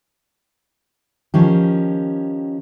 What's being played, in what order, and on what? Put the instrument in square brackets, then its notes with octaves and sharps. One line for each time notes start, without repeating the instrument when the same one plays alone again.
[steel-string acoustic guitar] D#3 F3 C#4 G4